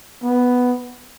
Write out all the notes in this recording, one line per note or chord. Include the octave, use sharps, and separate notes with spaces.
B3